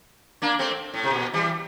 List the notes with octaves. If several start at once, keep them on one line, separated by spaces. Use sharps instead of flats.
A#3 D4
A3 C4
A2
C3
A#2
E3 G3